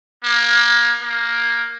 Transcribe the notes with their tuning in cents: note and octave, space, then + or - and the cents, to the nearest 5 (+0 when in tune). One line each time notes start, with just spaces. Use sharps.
A#3 +25
A#3 +5